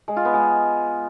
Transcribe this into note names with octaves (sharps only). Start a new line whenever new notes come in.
G#3
F4
B3
G#3